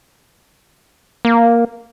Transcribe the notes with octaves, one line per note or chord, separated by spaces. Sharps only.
A#3